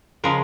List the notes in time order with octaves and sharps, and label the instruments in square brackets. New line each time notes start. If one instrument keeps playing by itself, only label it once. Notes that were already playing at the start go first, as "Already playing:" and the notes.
[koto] C#3 F3 G#3 A#4